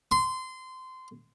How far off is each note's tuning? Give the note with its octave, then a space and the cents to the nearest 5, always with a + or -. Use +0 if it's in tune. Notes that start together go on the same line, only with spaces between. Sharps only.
C6 -20